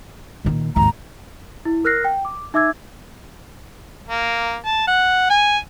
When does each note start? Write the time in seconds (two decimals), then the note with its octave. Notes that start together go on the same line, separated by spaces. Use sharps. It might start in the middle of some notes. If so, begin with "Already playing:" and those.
0.45 A#2 D#3
0.76 G#1 D#2 A#5
1.65 E4
1.85 A#4 F6 F#6 A#6 C7
2.05 G5
2.25 D6
2.54 D#4 E5 D6 E6 G#6
4.09 A#3
4.65 A5
4.87 F#5
5.30 G#5